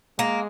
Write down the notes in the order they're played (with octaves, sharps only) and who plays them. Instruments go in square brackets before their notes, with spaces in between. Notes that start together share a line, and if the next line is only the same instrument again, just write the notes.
[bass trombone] G#3 [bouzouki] A#3